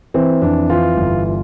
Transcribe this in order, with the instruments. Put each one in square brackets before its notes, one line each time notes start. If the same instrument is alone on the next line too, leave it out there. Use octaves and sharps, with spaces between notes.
[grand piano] E3 C4
F2 D4
E3 F4
G1
F4